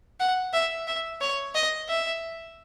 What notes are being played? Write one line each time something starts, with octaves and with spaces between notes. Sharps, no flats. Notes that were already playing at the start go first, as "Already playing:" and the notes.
F#5
E5
E5
C#5
D#5
E5